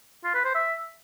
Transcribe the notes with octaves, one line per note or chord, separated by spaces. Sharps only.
F4
B4
C5
E5